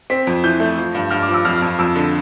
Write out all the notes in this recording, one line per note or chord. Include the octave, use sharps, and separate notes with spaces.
C4 B6
F2
E3 G6
A3
F3
G2
G2 F6
D6
F3
E6
F2 F6
F2
F2 E6
D3